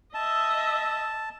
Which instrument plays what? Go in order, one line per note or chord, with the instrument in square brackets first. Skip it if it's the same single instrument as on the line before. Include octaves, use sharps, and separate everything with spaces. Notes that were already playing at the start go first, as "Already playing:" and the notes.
[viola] D#5 E5 [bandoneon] A5